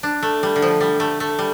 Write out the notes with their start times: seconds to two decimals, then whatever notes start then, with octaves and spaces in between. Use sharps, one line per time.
0.03 D4
0.23 A3
0.43 G3
0.56 D3
0.62 F3
0.80 G3
1.00 A3
1.20 A3
1.39 G3